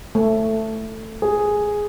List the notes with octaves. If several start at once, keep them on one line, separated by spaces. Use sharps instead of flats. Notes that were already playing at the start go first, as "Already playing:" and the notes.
A3
G#4